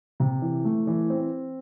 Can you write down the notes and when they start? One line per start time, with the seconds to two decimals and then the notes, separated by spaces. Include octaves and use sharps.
0.20 C3
0.42 E3
0.65 A3
0.87 E3
1.10 C4